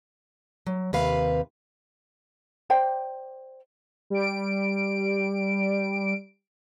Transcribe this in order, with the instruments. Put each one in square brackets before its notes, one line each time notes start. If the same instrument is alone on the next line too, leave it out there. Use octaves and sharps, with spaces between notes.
[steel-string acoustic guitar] F#3
D#2 C3 B4 F5
[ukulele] C5 D5 G5
[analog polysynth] G3 D7